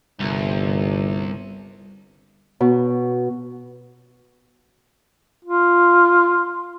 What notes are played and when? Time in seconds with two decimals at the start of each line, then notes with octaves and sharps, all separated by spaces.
0.21 G1 C2
2.60 B2
5.45 F4